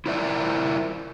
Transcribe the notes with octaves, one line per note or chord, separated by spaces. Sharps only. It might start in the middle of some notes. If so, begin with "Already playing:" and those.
E4 F4 A#4 C5 D5 E5